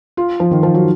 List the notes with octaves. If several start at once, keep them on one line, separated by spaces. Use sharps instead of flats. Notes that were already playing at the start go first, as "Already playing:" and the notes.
F4
F3
D#3
F3
F#3